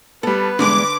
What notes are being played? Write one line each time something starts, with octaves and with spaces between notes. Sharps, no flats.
G3 B3 A4 B4
E2 G2 D3 G#3 D6